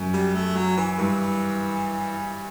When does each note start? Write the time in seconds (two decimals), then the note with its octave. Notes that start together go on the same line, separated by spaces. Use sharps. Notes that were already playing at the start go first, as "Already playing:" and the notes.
Already playing: F#2
0.14 G3
0.35 A3
0.56 F#3
0.77 E3
0.98 G2 E3